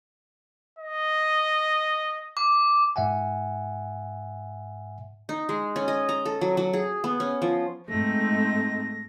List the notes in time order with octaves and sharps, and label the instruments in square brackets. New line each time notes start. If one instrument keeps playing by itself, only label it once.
[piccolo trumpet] D#5
[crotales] D6
[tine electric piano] G#2 E5 F#5 G#5
[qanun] D#4
G#3
C#4
D#5
A#5
A4
F#3
F#3
G#4
B3
C#4
F3
[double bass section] G#2 [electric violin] A3 [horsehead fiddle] C4 D#4 [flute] A#6